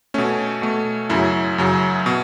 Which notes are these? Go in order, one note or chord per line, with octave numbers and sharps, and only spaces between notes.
B2 A3 C#4
B2 A3
F#2 C#3 F#3 E4
F#2 C#3 F#3
B2